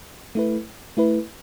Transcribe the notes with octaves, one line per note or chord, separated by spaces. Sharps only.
A3 E4 B4
A3 E4 B4